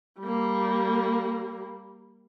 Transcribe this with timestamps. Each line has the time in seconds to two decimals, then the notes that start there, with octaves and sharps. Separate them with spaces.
0.20 G3 A#3